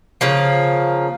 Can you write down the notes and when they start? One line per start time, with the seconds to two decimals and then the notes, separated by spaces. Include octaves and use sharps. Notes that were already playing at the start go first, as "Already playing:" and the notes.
0.21 C#3 F3 A#3